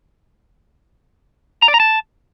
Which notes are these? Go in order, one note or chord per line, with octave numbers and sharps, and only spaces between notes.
A#5
D5
A#5
A5